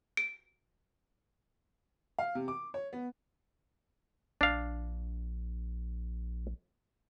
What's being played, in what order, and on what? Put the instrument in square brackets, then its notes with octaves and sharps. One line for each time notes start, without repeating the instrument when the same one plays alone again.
[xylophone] D7
[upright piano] F5
C3
D6
C#5
B3
[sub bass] A#1 [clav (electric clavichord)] D4 F5